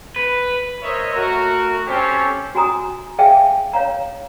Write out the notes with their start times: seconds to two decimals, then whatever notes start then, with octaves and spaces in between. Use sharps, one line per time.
0.16 B4
0.83 A#4 C5 C#5 D#5 E5
1.14 A3 F#4 A#4
1.87 C4 C#4 G4 A4 C5 C#5
2.55 F#4 G#5 A#5 D#6
3.19 G#4 E5 F5 G5 G#5
3.73 C#5 F5 A#5